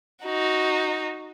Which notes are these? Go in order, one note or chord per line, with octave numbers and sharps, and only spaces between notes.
D#4 F#4